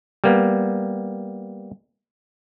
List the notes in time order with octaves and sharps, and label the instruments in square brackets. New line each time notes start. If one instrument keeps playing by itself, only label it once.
[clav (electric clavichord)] G3 A#3 B3